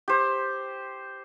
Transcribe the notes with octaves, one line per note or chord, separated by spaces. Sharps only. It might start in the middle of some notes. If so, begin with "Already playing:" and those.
G4 C5